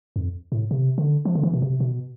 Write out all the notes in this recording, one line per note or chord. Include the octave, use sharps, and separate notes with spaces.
F2
A2
C3
D3
F3
D3
E3
B2
C3
B2